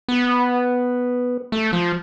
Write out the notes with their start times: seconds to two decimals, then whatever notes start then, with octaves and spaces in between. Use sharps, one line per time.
0.08 B3
1.52 A3
1.73 F3